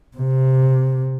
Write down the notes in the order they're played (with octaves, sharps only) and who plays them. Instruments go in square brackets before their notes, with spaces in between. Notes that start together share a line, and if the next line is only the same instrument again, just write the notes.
[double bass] C3